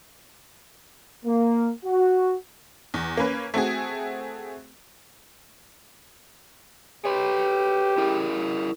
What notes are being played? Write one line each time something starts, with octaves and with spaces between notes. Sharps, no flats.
A#3
F#4
E2
A#3 C#4 B4
A3 C4 F#4 G#4
G4 B4 C#5
E4 G#4 A#4